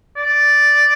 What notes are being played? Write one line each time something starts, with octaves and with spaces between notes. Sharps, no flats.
D5